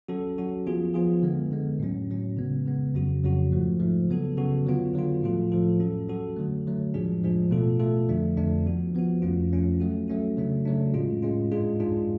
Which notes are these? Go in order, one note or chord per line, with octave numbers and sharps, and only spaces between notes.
F#3 C#4 F#4 A4
F#3 C#4 F#4 A4
F3 B3 F4 G#4
F3 B3 F4 G#4
D3 G#3 B3
D3 G#3 B3
A2 F#3 C#4
A2 F#3 C#4
C#3 G#3 B3
C#3 G#3 B3
F2 C#3 F#3 C#4 F#4
F2 C#3 F#3 C#4 F#4
G#2 F3 A3
G#2 F3 A3
C#3 F#3 B3 F#4 A4
C#3 F#3 B3 F#4 A4
D3 F#3 B3 F4
D3 F#3 B3 F4
A2 F3 A3 F4 A4
A2 F3 A3 F4 A4
F#3 C#4 F#4 A4
F#3 C#4 F#4 A4
D3 F#3 A3
D3 F#3 A3
A2 F3 G#3 D4 G#4
A2 F3 G#3 D4 G#4
B2 A3 F4 A4
B2 A3 F4 A4
F2 D3 F3 A3 D4
F2 D3 F3 A3 D4
F3 B3 F#4
F3 B3 F#4
F2 F3 A3 C#4 F4
F2 F3 A3 C#4 F4
F#3 A3 C#4 F#4
F#3 A3 C#4 F#4
C#3 F#3 A3 D4
C#3 F#3 A3 D4
A2 G#3 C#4 F4
A2 G#3 C#4 F4
G#2 G#3 D4 F4 G#4
G#2 G#3 D4 F4 G#4